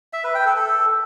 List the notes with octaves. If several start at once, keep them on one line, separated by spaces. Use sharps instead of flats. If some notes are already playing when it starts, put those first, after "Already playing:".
E5
B4
G5
A4
A4